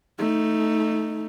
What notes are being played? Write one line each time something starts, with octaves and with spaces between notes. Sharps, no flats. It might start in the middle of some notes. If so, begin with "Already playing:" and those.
A3 D#4